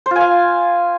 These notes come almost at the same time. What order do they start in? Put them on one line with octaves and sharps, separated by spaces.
C5 F4 G#5 F5